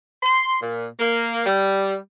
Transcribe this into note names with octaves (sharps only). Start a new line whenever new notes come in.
C6
A#2
A#3
G3